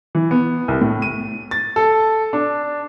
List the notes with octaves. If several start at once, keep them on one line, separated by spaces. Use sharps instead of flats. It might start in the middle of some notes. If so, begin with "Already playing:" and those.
E3
B3
C2
A2
D#7
A6
A4
D4